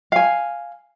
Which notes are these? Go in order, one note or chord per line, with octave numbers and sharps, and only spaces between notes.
F5 G#5